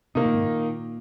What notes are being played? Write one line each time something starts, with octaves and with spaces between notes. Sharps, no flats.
C3 D#3 A#3 D#4
A#2
G#2
A#2